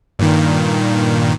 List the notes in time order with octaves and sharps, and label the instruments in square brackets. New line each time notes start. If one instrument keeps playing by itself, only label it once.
[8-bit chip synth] G2 A#2 D#3